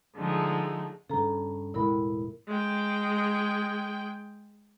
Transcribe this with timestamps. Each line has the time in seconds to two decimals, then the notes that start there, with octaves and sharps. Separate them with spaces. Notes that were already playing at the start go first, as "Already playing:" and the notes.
0.17 D3 F3 G#3 A3 D#4
1.10 G2 C#3 A4 A#5
1.74 E1 A2 G#3 E4 A#4 B5
2.48 G#3 G5